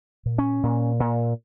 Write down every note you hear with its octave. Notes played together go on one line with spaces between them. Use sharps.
A#2
C#4
A#2
A#2